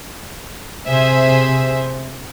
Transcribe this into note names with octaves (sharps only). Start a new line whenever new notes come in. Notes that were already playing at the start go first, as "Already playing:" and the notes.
C3 G#4 C5 E5